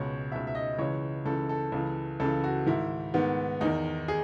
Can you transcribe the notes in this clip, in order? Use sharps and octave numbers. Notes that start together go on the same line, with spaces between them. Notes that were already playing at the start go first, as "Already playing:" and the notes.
Already playing: C#2 B2 C#5
C#2 B2 E5
E5
D#5
C#2 C#3 E3 C#5
C#2 C#3 E3 A4
A4
C#2 C#3 E3
C#2 C#3 E3 A4
F#4
G#2 D#3 E4
G#2 D#3 B3
E2 D#3 D#4
G#4